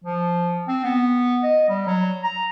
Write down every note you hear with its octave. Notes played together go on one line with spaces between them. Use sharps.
F3
C4
B3
D#5
G3
F#3
A#5